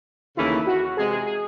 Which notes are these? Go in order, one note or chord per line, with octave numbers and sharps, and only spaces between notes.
D#2 C#3 E3 A3 C#4 E4
F#4
C3 E3 G#3 G#4
G#4
G#4